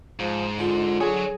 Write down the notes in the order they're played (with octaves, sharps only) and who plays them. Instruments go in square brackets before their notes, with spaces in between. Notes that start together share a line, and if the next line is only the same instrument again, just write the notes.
[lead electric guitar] G#2 [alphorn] F3
[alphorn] D3 [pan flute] F4
[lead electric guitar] F#3 C#5 [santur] G#4